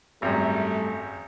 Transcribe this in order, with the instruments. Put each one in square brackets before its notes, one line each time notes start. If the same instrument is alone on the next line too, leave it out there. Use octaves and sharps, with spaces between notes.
[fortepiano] G#1 F#2 [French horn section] G3 A3